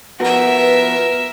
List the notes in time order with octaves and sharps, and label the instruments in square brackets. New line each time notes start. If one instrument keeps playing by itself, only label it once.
[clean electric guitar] F3 B3 F#4 [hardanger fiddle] A#4 E5 [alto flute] F#5
[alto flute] B4